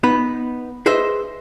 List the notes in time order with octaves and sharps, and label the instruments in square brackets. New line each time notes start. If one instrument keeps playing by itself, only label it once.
[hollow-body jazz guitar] B3 D#4 B4
G#4 B4 C5 D#5 E5